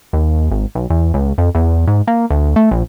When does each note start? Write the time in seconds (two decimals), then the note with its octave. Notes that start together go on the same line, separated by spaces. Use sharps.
0.13 D#2
0.51 G#1
0.75 B1
0.90 E2
1.14 C#2
1.38 F2
1.55 E2
1.87 G#2
2.07 A#3
2.30 D2
2.56 A3
2.71 A#1